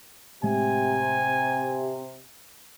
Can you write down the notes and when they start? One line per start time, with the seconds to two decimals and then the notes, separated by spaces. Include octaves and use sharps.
0.43 A2 C3 G#3 A3 G#5